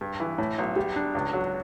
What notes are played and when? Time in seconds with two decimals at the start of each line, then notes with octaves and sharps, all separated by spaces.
0.01 G2
0.20 E3
0.38 A2
0.58 B1
0.76 G3
0.96 D4
1.15 C#2
1.33 F#3